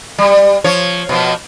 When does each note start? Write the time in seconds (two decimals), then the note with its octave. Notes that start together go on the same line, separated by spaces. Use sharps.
0.18 G3
0.64 F3 C#5
1.09 B2 F3